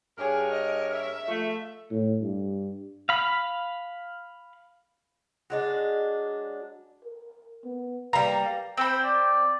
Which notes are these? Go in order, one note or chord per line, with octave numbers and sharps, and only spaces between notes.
G2 G#4 A#4 C#5
D#5
E5
F3 A3
A2
G2
F5 B5
F#3 G#3 D4
A#4
B3
G3 A#3 B4 A#5
C4 C5 G5 B5
D5